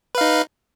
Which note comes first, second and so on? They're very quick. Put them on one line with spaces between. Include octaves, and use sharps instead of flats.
B4 F5 D#4